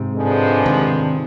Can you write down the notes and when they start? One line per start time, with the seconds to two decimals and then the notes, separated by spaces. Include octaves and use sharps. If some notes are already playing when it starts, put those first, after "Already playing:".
Already playing: G#2 C3
0.14 G2 D3 F3 G#3 D4
0.66 C3 D#3